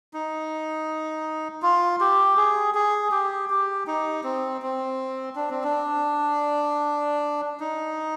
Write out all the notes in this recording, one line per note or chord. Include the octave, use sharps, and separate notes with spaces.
D#4
F4
G4
G#4
G#4
G4
G4
D#4
C4
C4
D4
C4
D4
D#4